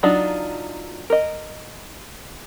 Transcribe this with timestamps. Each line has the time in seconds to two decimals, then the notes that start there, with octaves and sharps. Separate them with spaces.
0.03 F#3 D4 D#4 F4
1.10 A#4 D#5